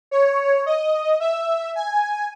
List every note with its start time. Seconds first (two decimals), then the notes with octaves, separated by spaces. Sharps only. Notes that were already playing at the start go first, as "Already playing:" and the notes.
0.11 C#5
0.66 D#5
1.20 E5
1.76 G#5